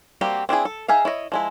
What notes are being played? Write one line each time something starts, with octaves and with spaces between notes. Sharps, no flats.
G3 A#3 C4 F#4 G4
C4 D4 E4 G#4
A4
D#4 G#4 E5 F5
E4 C#5 D#5
F3 G#3 E4